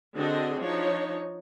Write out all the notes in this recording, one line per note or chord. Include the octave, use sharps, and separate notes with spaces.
D3 C4 D4 F#4 G#4 D#5
F3 D4 D#4 C#5